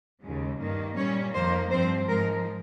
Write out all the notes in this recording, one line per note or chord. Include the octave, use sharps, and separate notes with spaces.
D#2 C#3 G#3
G2 D#3 A#3
A#2 G3 C#4 C#5
F2 D#3 A#3 C5
G2 F3 C4 C5
G#2 F3 G#3 A#4